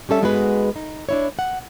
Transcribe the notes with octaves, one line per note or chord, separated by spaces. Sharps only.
G3 C#4 A4 E5
G#2 G#3 B3 F#4 G#4 B4
D#4
D4 E4 C#5
F#5